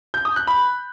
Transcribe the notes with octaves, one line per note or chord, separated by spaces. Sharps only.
G6
D#6
F#6
B5